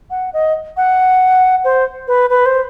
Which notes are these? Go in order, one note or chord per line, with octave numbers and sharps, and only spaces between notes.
F#5
D#5
F#5
C5
B4
B4
C5